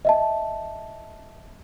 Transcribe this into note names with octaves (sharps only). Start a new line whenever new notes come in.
D#5 E5 A5